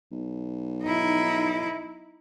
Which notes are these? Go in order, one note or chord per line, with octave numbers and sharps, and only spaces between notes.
B1
D#4 E4